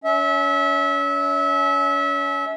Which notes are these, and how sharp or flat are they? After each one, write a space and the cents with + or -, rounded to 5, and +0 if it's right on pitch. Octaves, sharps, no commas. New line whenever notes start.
C#4 +35 E5 -25